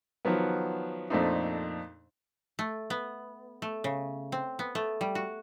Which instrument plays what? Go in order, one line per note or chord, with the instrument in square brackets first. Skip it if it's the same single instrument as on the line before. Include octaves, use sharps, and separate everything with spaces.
[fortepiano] D#3 F3 F#3 B3
F2 A#2 A3 C4 D4 D#4
[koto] A3
B3
A3
C#3
C4
B3
A3
G3
F#4